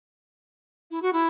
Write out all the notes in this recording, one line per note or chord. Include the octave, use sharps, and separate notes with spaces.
E4
F#4
E4